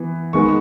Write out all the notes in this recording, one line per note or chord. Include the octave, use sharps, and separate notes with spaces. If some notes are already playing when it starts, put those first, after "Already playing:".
Already playing: E3 B3
D#3 G#3 B3 C#6